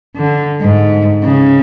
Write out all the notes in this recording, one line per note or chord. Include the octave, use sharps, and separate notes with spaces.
D3
G#2
C#3